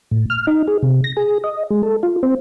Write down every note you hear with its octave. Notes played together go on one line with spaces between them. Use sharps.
A2
F6
D#4
G#4
C3
A#6
G#4
D#5
G#3
A4
F4
C4